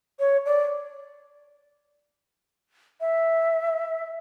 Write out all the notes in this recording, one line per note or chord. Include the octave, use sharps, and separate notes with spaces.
C#5
D5
E5